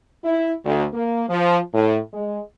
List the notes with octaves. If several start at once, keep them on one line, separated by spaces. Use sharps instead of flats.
E4
D2
A#3
F3
A2
G#3